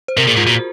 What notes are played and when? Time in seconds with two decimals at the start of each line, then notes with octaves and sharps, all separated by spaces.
0.08 C5
0.17 C3 A#4
0.27 A#2 G#4
0.37 G#2 F4
0.46 A#2 F#4